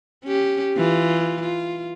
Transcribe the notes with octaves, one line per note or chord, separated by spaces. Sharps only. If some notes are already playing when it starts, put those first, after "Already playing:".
C#4 G4
E3 F4
F4